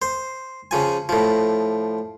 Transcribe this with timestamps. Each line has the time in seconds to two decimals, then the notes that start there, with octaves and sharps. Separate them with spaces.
0.02 C5
0.71 C#3 F3 G#5
1.09 A2 F3